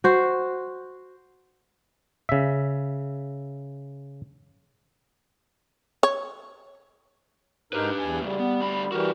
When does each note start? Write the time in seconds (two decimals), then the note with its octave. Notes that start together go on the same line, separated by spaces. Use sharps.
0.04 F#4 C5
2.29 C#3 E5
6.03 C#5
7.73 G#2 D#4 G4 A#4 B4
7.99 E2 G#5
8.22 A2 C#3 G3
8.39 B3
8.60 D2 B5
8.92 E3 G3 F#4 G4 A#4